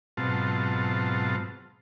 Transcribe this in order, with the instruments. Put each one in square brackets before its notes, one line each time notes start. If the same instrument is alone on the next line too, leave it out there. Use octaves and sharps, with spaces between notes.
[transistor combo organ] G#2 B2 F#3 C4 F4 A5